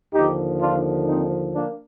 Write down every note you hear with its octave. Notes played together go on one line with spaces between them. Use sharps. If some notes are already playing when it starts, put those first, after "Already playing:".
D#2 D3 F3 D#4 G4
D4 F4
C4 D#4
A#3 D4